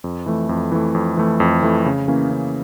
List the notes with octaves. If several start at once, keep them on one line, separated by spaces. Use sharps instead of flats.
F2
E3 A3
F2
E3 A3
F2
E3 A3
F2
E3 A3
C#3
E3 A#3 C#4
C#3